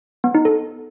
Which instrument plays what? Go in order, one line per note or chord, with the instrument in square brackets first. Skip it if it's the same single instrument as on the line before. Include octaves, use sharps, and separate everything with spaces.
[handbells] B3
D#4
A4